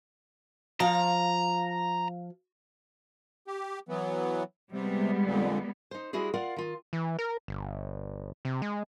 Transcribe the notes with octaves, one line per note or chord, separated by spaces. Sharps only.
F3 F5 A#5
G4
E3 F#3 B3
C3 G3 G#3 B3
F2 A#2 D3
D#4 C5
G3 G#3 E4 F#4 G#4
F4 A#4 D5 F5 F#5
D#3 F4
E3
A#4
G1
C3
G#3